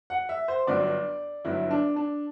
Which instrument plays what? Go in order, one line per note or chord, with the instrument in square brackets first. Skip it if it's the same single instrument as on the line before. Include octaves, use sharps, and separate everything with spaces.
[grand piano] F#5
E5
C5
G1 G2 F#3 D5
G1 G2 F#3 E4
D4
D4